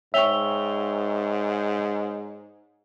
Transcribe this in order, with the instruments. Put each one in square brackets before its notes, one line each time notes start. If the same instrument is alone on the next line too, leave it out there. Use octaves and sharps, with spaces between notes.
[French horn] G#2 [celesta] C#5 F7 G7 [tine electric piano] E5 G5 C#6